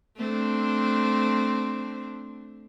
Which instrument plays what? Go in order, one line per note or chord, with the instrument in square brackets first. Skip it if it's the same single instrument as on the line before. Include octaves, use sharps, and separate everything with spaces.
[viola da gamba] A3 C4 D4